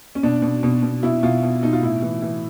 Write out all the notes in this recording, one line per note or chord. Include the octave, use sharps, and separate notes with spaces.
C#4
B2 D4
B2
B2
B2
B2 E4
B2 F4
B2
B2 D#4
F4
A2 E4
E3
E3